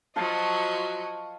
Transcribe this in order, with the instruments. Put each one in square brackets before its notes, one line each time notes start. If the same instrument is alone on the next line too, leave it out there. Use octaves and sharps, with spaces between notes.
[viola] F3 F#3 [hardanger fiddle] F#4 D#5 [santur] F5 A5